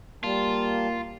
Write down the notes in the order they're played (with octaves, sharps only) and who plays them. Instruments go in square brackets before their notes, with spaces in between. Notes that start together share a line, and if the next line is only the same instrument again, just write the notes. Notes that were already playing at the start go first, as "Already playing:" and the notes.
[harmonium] G3 A5 [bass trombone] A#3 [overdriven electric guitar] F4